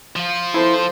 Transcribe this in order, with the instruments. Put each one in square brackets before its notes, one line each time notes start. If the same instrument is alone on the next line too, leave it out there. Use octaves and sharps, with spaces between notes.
[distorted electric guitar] F3 F4
[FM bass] E4 [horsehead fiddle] A4 C5